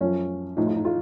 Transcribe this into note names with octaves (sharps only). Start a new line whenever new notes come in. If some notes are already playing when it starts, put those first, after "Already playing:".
F#2 F3 C#4
A2 F3 D#4
F4
D#4
F4